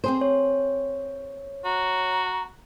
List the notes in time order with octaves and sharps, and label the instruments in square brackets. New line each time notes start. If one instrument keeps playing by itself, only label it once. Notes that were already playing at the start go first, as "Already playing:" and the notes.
[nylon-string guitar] C4 G#4 C5
[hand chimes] C#5
[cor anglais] F#4 [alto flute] A#5